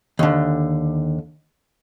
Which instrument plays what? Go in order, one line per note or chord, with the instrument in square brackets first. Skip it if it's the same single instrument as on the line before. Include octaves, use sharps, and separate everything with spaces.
[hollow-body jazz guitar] D#2 D3